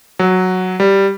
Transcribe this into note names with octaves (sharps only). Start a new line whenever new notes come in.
F#3
G3